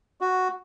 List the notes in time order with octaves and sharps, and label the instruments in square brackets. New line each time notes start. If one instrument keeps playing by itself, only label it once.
[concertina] F#4